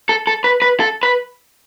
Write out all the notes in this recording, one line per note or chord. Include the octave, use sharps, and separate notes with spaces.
A4
A4
B4
B4
A4
B4